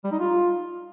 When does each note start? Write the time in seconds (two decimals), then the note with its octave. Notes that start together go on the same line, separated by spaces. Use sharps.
0.04 G3
0.12 D#4
0.20 F4